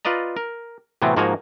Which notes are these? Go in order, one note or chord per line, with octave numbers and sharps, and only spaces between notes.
F4 B4 D5 D#5 A#5
A#4
A2 C3 E3 F#3 B3 C4
G#2 F3 A#3 F#4 G#5 A#5